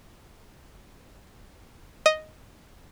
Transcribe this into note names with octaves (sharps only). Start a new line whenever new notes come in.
D#5